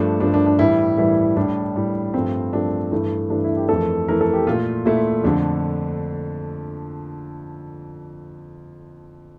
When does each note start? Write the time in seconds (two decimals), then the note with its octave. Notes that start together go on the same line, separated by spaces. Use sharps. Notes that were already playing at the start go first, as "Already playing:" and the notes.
Already playing: G2 F3 A3 D4
0.20 G2 F3 A3 D4
0.34 D4
0.46 D4
0.59 A2 E3 G3 E4
0.97 A2 E3 G3 E4
1.37 A2 G3 D4
1.76 A2 G3
2.14 G2 F3 A3 C4
2.53 G2 F3 A3 D4
2.92 G2 E3 A3
3.30 G2 E3 A3 D4
3.44 E4
3.57 G4
3.69 F2 E3 A3 A4
4.08 F2 E3 A3 A#4
4.21 A4
4.33 G4
4.47 A#2 A3 F4
4.86 A#2 A3 E4
5.24 F2 D3 A3 D4